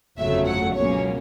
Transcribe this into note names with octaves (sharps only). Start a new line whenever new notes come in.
G1 F2 C#3 F#3 A3 E5
F#5
C#2 B2 F#3 A#3 C#4 C#5